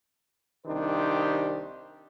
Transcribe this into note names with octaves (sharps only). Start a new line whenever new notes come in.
C2 D#3 D4 D#4 G4 C5